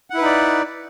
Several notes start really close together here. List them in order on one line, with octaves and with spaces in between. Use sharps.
F#5 E4 B4 D#4 D5